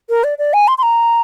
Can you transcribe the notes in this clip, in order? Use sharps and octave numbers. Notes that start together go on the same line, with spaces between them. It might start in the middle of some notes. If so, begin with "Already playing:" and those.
A#4
D5
D5
G#5
C6
C6
A#5